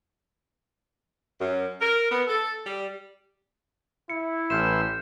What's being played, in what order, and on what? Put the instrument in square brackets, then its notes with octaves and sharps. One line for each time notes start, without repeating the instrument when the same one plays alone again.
[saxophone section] F#2
A#4
B3
A4
G3
[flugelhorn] E4 [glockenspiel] C#7
[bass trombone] A1 [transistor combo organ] B4 E5 C6 [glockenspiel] F6 G6 E7